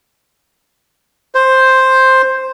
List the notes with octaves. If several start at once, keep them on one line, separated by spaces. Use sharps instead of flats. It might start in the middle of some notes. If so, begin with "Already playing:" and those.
C5